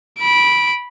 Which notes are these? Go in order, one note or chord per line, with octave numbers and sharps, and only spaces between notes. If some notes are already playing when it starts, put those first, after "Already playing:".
B5 D7